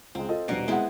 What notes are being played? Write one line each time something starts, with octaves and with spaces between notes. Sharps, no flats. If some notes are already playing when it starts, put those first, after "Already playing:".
C#2 G#3 C4
F4 A4 D#5
D#1 B2 D4 A#4 F#5 C7
G#3 B3 C4 E4 F#5